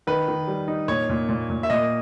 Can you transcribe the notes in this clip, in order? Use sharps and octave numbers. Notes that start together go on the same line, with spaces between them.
D#3 B4
D#3
G3
D#4
A#2 C#5
A#2
A#2
A#2
E5
A#2 D#5